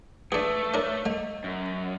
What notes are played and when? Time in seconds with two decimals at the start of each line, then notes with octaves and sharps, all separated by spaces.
0.32 A3 D4 G#4 B4 A5 D#7
0.74 D4 A#4 C#5
1.06 A3 D#5
1.44 F#2